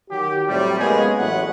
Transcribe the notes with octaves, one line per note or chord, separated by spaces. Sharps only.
D#3 F#3 G4
A2 C3 F#3 G3
G#3 A#3 B3 C#4 G#4
A1 A2 F#3 B4 F#5